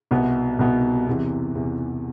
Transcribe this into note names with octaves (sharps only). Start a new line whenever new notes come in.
C2 B2 B3
C2 B2 B3
E2 C3 E3
E2 C3 E3